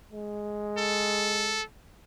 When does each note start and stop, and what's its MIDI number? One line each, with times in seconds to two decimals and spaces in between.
0.12 1.64 56
0.78 1.62 69